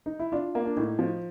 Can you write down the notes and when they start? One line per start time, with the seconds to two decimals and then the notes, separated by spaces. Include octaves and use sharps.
0.06 D#4
0.19 E4
0.32 D4 F4
0.55 A#3
0.65 D4
0.77 A2 D#4
0.99 F3